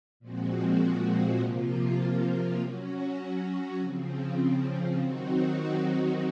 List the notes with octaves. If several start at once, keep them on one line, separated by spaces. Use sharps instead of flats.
A#2 F3 G#3 C4 F#4
C3 F3 A#3 F4
F#3 C#4 F#4
C#3 F3 C4
D#3 F#3 C4 D#4 F#4